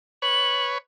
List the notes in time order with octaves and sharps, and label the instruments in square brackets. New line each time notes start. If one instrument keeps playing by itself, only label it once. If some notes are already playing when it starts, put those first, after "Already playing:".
[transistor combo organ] B4 C#5 [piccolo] F#7